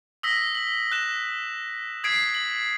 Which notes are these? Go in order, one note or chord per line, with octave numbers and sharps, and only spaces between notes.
D#6 E6 A#6 B6
F#7
F#6 E7
D#6 G#6 B6 C7 D7
F#7